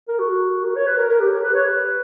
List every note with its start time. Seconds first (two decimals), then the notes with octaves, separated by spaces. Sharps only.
0.08 A#4
0.19 F#4
0.64 A#4
0.76 C#5
0.87 B4
0.97 A#4
1.09 A#4
1.20 G4
1.42 B4
1.54 C#5
1.65 B4